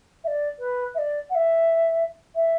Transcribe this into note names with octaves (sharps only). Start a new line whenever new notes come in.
E5
D5
B4
E5
D5
F#5
E5
E5